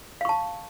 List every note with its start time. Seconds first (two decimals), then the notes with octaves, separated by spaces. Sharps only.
0.21 F5
0.25 C#6
0.29 A5